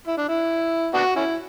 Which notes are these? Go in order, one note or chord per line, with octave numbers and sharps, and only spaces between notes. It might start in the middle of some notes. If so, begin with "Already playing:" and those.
E4
D4
E4
B3 D4 F#4
C#4 E4